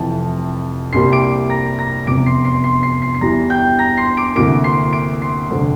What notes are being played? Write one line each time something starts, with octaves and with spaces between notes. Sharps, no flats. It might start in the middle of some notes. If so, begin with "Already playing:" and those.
Already playing: F1 F2 C3 E3 A5
C2 C3 G3 A#3 C6 C7
D6 D7
A#5 A#6
A#5 A#6
F1 E2 C3 D6 D7
C6 C7
C6 C7
C6 C7
C6 C7
C6 C7
C7
E2 E3 G3 A#5 A#6
G5 G6
A#5 A#6
C6 C7
D6 D7
D2 C3 E3 A#3 D6 D7
C6 C7
D6 D7
C6 C7
F1 F2 D3 A3 C4